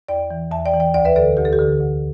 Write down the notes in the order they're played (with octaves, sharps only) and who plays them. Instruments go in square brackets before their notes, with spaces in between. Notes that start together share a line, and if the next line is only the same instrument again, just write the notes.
[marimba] E2 D5 G5
E3
E2 E5 A5
D5 G5
E3
D5 G5
D2 D5 G5
B4 E5
D3 A4 D5
D2 G4
A4
G4
D3
D2